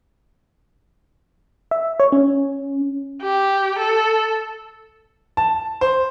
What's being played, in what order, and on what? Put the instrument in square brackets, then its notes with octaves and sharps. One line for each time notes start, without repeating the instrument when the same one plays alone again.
[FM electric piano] E5
C#5
C#4
[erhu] G4
A4
[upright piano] A5
C5